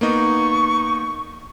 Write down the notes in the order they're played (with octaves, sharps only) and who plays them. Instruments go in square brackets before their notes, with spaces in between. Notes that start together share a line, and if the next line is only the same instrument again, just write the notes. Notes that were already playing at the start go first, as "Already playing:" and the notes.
[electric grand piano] A#3 B3 D#4 [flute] C#6